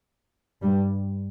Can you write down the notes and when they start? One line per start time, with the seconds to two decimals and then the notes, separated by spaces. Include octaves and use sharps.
0.62 G2 G3